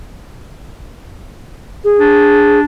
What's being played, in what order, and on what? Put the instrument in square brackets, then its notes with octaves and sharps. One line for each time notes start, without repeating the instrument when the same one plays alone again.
[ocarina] G#4
[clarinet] D4